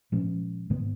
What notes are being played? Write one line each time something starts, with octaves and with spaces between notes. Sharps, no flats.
A#2 F3 G#3 C#4
G#2 D#3 G#3 B3